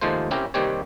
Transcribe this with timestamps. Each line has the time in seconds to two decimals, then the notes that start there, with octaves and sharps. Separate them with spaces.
0.01 D#2 F3 G#3 A3 F4 C5
0.31 C4 C#4 E4 G4 A#4
0.54 D#2 D#3 G3 C4 G4 C#5